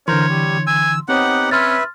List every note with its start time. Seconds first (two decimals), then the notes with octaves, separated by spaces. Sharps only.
0.08 D3 E3 A#4 C5 C#5 C6
0.29 G3
0.67 G#5 E6
1.09 B3 C4 D#4 G4 C#5 F#5
1.51 C#4 B4 E5 C6 F6 A6